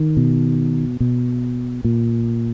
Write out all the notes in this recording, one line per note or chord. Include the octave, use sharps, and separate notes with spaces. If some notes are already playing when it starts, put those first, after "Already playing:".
Already playing: D#3
B2
B2
A#2